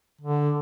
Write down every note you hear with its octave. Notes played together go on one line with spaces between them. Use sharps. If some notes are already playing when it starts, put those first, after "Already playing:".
D3